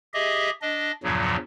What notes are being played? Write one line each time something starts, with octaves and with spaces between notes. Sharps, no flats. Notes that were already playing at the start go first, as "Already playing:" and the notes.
G4 G#4 D#5 E5
D4 D#5
E2 G2 A#2 C#3 F3 F#3